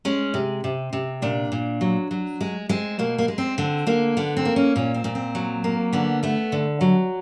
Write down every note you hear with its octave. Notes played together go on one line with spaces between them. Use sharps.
G#3 C#4
C3
C3
C3
A#2 D4
A#2
F#3
F#3
G#3
G#3 C4
B2 A#3
A#3
G#3
C4
D3 C4
D3 A#3
D3 B3
C4
A#3
C#4
A#2 C#4
C4
A#2
C4
F#3
A#3
D3 B3
A3 B3
D3
F#3